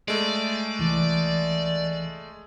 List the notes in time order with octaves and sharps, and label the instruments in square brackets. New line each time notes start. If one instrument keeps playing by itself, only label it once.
[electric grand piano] G#3 A3 [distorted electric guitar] D5
[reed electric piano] C2 E3